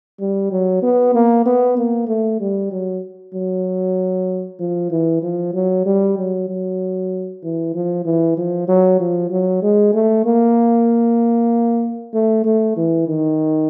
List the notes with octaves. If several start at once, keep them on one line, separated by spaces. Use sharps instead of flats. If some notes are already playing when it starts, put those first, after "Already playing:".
G3
F#3
B3
A#3
B3
A#3
A3
G3
F#3
F#3
F3
E3
F3
F#3
G3
F#3
F#3
E3
F3
E3
F3
F#3
F3
F#3
G#3
A3
A#3
A3
A3
E3
D#3